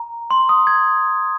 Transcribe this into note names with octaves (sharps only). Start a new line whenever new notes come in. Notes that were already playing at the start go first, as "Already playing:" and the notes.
Already playing: A#5
C6
D#6
G#6